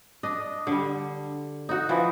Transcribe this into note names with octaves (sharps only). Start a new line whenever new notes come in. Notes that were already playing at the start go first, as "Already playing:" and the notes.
D4 D#5
D3 G3
D#4 F#4
E3 F3